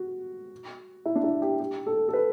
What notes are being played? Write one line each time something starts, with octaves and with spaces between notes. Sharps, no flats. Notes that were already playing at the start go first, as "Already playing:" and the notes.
Already playing: F#4
E4
D4
E4
G4
G4
A4
A4
B4